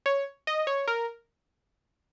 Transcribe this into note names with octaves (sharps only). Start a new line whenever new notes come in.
C#5
D#5
C#5
A#4